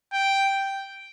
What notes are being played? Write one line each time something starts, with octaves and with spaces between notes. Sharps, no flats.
G5